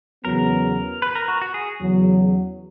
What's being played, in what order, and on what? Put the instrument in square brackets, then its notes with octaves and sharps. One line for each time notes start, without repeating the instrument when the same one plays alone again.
[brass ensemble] E2 C#3 F#3 B3 [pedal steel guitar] A#4
[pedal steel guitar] B4
A#4
F#4
F#4
G#4
[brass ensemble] E2 C#3 F#3